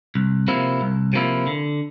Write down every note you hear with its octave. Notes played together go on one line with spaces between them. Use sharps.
C2
C3 F3 A#3 E4
C2
C3 F3 A#3 E4
D3